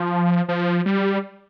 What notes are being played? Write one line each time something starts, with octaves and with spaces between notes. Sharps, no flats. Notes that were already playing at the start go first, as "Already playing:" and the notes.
Already playing: F3
F3
G3